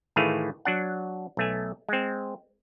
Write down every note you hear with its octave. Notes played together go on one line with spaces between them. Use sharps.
A2 D#3 E3 A3 G#4 F5
F#3 D4 F#5
B1 A3 G#5
G#3 C4